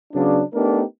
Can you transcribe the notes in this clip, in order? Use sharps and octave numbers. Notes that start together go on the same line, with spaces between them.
C#3 F#3 B3 D4
A3 B3 D4 D#4 G4 A#4